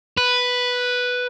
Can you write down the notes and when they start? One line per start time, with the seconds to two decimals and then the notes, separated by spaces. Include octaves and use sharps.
0.17 B4